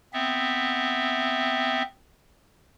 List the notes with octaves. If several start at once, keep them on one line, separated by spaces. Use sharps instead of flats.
B3 C4 E5